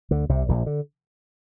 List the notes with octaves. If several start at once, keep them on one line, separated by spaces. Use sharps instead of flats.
D2 D3
C2 C3
A#1 A#2
D3